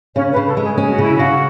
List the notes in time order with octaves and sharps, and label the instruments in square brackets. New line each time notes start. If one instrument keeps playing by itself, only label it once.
[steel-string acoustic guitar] C#3 [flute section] C#4 C#5
[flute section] B4
[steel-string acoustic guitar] C#3
[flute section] A4
[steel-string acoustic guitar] G#3
[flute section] G#4
[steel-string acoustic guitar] C#4 [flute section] G#4
[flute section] F#4
[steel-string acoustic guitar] C#3 [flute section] E4
[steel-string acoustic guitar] C#3 [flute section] F#4